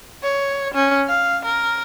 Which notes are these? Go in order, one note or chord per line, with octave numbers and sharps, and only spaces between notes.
C#5
C#4
F5
A#4